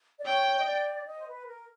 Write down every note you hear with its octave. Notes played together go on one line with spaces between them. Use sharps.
D5
C#5 G5
D#5
D5
D#5
C5
B4
A#4